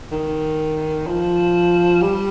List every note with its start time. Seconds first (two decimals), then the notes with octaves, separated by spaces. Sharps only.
0.12 D#3
1.07 F3
2.02 G3